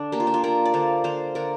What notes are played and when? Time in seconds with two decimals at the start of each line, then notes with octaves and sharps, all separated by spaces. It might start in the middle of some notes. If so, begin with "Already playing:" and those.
Already playing: D3 D4
0.12 A#3 G4
0.20 F4
0.27 D4
0.34 F4
0.44 A#3 A#4 D5
0.65 D5
0.74 D3 C5 F5
1.04 D3 C5 F5
1.35 D3 A#4 D5